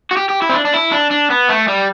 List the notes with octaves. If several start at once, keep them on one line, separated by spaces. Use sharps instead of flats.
F#4
G4
G4
E4
C4
D4
D4
E4
D4
D4
B3
A3
G3